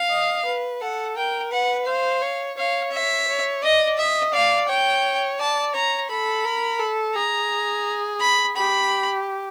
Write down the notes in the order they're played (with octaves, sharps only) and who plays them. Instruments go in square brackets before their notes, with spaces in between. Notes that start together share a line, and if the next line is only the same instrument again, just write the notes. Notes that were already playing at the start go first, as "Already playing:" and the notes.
Already playing: [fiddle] F5
[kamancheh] D#5
B4
[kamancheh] A4 [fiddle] F#5
[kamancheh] A#4 [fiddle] G5
[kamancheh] B4 [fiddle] F#5
[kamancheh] C5 [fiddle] F5
[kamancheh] C#5
[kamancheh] C#5 [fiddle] F5
[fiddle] E5
[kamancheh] C#5
[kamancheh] D5 [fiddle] D#5
[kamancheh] D#5 [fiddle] E5
[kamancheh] D5 [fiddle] F5
[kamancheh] C#5 [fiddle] G5
[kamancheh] D5 [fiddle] A5
[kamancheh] C#5 [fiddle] A#5
[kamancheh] A4 [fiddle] B5
[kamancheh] A#4
A4
[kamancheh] G#4 [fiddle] A#5
[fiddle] B5
[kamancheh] G4 [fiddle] B5